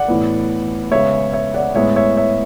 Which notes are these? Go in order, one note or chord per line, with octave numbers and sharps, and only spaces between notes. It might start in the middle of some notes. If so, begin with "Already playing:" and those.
Already playing: D5 F#5
A2 E3 B3
C#3 G#3 B3 C#5 E5
C#5 E5
D5 F#5
A2 G#3 B3 C#5 E5
C#5 E5
C#5 E5